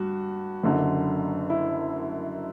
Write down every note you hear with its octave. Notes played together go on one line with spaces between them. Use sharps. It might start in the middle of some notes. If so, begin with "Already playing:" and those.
Already playing: G2 F#4
F#1 F#2 D3
E4